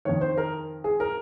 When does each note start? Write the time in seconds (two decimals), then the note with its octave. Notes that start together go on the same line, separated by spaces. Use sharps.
0.05 F2 D#3 C#5
0.21 C5
0.37 A#4
0.84 G#4
1.00 A#4